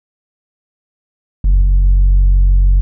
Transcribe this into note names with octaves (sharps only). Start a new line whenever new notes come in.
F#1